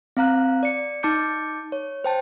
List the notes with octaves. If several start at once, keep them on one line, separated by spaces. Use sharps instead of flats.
C4 F5 A#5 F#6
D5 C#7
D#4 A5 D6 G6 C#7
C#5
C5 G5 A5